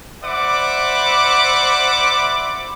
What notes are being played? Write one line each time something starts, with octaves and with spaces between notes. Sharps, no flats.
C5 D5 E5 F#5 B5 D6